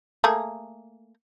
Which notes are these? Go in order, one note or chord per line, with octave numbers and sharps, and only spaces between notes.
A3 A#3 G#4